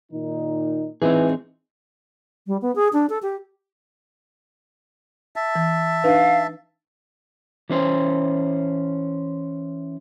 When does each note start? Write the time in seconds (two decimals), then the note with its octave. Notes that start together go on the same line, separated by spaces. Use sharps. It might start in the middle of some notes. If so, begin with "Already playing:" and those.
0.12 A#2 D#3 D#4
1.02 E3 C4 D#4 G#4
2.47 G3
2.62 B3
2.76 G#4
2.93 D4
3.10 A4
3.23 G4
5.36 E5 A5
5.56 E3
6.04 D4 D#4 B4 F5
7.70 E3 C#4 C5